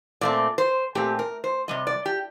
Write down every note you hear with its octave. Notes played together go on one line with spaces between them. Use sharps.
A#2 A3 C4 D5
C5
A#2 A3 C4 G4
A#4
C5
C3 G3 D#5
D5
G4